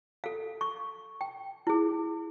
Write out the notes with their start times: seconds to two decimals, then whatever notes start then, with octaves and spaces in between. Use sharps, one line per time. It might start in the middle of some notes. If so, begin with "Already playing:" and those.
0.24 A4 F5
0.61 C#6
1.21 G5
1.67 E4 G#4